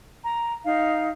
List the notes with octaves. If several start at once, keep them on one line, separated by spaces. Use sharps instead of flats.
A#5
D#4 F5